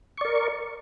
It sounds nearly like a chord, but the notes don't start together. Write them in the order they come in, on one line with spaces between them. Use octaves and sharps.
C#6 D5 A#4